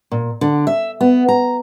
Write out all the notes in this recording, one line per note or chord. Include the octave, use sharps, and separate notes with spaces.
A#2
D3
E5
B3
A#5